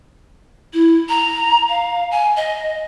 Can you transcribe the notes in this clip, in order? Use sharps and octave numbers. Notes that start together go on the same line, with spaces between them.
E4
A#5
F5
G#5
D#5